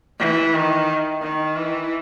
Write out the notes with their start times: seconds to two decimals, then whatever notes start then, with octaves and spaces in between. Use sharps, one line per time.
0.20 E3
0.54 D#3
1.22 D#3
1.56 E3